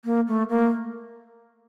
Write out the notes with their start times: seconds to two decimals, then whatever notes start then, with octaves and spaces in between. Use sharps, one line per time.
0.05 A#3
0.28 A3
0.49 A#3